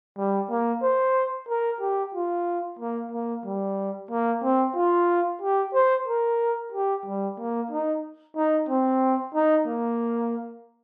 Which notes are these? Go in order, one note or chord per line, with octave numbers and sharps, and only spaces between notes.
G3
A#3
C5
A#4
G4
F4
A#3
A#3
G3
A#3
C4
F4
G4
C5
A#4
G4
G3
A#3
D#4
D#4
C4
D#4
A#3